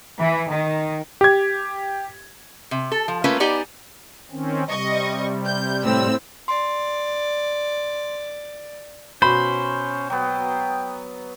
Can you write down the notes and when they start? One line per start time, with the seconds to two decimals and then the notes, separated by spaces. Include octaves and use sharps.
0.19 E3
0.50 D#3
1.21 G4 G#6
2.71 C3
2.92 A4
3.08 F3
3.24 A3 A#3 C#4 F4 A#4 B4
3.40 B3 D#4 G4 D5 G#5
4.31 D#3 C4 C#4
4.68 C3 G3 D#5 C#6
5.46 G6
5.84 A2 C4 E6
6.48 D5 C6
9.22 B2 C#4 C5 B5
10.10 F#3 B3 G5